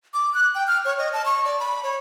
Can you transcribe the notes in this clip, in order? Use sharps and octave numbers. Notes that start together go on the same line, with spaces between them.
D6
F#6
G5
F6
C#5
D#5
A5
C#6
D5
B5
C#5